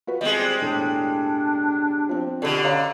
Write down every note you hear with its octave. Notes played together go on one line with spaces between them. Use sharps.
F4 F#4 B4
G3 G#3 C4 C5 D#5
E1 A2 D4
F3 C4
B2 D3 G4 A4 D5
C#4 C#5 F5 A#5